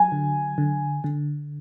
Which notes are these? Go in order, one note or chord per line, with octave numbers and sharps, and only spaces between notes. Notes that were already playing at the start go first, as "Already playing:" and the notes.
Already playing: F#3 G#5
D3
D3
D3